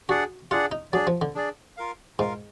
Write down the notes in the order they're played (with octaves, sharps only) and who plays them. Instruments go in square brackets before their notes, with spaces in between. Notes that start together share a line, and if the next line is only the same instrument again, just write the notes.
[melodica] D4 G#4 D5 F#5 [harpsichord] F#4
[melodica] D4 G#4 D5 F#5 [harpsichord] F4
[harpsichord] D#4
[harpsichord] F#3 [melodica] D4 G#4 D5
[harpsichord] F3
D3
[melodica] D4 G#4 D5
F4 A#4 F5
[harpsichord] G#2 [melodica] F4 A#4 F5